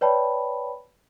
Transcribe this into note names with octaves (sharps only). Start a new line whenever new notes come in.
B4 C#5 D5 G5 A5 B5